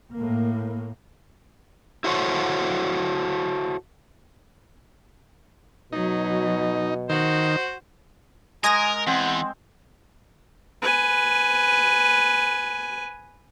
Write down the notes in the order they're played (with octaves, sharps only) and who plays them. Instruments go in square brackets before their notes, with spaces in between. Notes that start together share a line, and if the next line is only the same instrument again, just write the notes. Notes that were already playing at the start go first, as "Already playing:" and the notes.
[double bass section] A2 A#3
[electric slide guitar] E4 F#4 A4 C5 C#5 F#5
[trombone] B2 [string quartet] F#3 [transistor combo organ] D#4
[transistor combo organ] D#3 [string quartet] F#4 [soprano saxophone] C5
[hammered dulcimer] G#3 [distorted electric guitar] A#4 [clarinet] G#5 [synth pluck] D#6 G#6 A#6
[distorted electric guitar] E2 [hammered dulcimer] C4 [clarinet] F#5
[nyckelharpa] B4 G#5